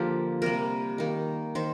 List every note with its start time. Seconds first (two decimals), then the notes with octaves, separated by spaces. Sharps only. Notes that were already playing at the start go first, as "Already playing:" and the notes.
Already playing: D3 F3 A#3 G4
0.42 C3 G3 A#3 A#4
0.98 D#3 A#3
1.55 D#3 C5